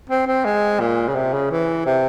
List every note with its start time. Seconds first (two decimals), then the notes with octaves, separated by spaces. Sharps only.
0.09 C4
0.27 C4
0.45 G#3
0.80 A#2
1.08 C#3
1.15 C3
1.34 C#3
1.51 E3
1.86 C3